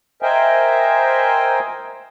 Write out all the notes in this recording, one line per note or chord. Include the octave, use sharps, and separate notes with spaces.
A#4 C5 D#5 E5 G5 G#5